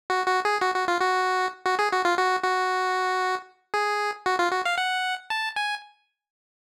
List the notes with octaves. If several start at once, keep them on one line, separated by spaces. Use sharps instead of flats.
F#4
F#4
G#4
F#4
F#4
F4
F#4
F#4
G#4
F#4
F4
F#4
F#4
G#4
F#4
F4
F#4
F5
F#5
A5
G#5